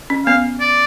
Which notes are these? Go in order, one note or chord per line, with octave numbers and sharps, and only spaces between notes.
C#4
B3 F5
D5